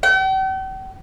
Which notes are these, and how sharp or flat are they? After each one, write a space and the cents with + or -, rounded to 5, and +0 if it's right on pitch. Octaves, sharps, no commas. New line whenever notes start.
G5 -45